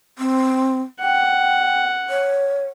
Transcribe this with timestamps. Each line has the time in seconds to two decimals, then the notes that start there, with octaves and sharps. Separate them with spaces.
0.18 C4
1.01 F#5 G5
2.10 C#5